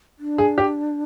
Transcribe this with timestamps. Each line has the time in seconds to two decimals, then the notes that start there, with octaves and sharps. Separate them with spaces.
0.19 D4
0.38 G#4
0.58 G4